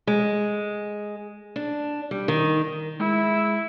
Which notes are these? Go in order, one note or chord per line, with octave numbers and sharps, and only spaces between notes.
G#3
D4
G3
D#3
G#3 E4